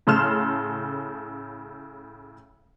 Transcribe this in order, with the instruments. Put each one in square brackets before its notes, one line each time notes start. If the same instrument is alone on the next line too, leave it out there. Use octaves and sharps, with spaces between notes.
[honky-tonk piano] A2 C#3 A4 C6 F6 E7